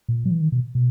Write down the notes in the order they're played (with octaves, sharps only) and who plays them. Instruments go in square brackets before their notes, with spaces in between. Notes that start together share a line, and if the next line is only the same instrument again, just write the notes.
[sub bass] A#2
F#3
E3
D#3
B2
B2